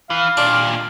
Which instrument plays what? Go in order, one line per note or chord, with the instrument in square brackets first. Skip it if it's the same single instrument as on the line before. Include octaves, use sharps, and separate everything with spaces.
[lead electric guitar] E3 [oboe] F5
[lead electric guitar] D#2 A#2 [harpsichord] D4